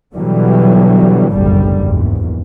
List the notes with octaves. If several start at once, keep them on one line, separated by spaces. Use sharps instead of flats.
B2 D3 E3 F#3 G3
F#1 B1 F2 A2 D3 G3
A#1 E2 G#2